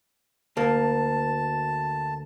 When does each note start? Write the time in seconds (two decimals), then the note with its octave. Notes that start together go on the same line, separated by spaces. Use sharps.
0.57 D2 A#3 A5